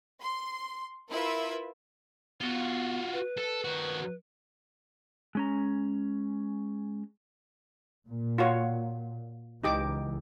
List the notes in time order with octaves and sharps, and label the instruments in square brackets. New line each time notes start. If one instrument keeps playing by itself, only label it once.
[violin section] C6
E4 F4 A#4 B4 E5
[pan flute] B3 [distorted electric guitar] F4 F#4
[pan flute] B4
[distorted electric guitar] A4
D#3 F#4
[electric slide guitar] G#3 C#4 A#5
[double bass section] A#2
[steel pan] F4 F#4 C#5
[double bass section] C#2 E3 [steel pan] D#4 G4 D6